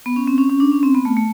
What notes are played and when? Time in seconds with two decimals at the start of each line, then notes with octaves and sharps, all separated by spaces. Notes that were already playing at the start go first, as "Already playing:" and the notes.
0.06 B3
0.16 C#4
0.27 C4
0.38 C#4
0.49 C#4
0.60 D4
0.72 C#4
0.83 C4
0.95 B3
1.05 A3
1.17 A3